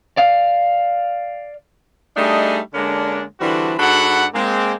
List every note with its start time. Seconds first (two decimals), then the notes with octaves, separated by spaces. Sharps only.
0.17 D5 F5
2.17 G3 A3 D4 D#4 G#4 D#5
2.74 D3 G#3 A#3 C#4 D4
3.40 D3 E3 G3 C4 D4 F#4
3.79 G#2 D4 F#4 A4 F#5 B5
4.34 G#3 A#3 C4